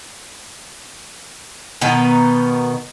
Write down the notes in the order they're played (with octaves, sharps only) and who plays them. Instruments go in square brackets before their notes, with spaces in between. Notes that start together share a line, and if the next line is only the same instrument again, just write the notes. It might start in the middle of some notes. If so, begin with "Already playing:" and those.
[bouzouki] B2 D#3 B3 D#4